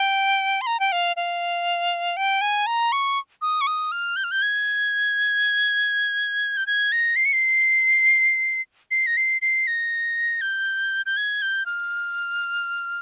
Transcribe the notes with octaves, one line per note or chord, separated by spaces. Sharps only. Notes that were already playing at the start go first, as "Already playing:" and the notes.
Already playing: G5
C6
A#5
G5
F5
F5
G5
G#5
A#5
C#6
D#6
C#6
D#6
F6
G6
F6
G6
G#6
G6
G#6
A#6
C7
C#7
C7
C7
A#6
C7
C7
A#6
G6
G6
G#6
G6
F6